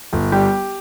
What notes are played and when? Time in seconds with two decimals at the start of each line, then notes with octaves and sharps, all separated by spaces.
0.13 G1
0.32 G3 G4